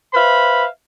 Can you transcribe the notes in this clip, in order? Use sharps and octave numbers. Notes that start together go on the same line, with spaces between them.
B4 C5 E5 F5 B5